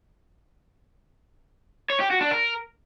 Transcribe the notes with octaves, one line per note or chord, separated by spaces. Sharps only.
C#5
G4
F#4
D4
A#4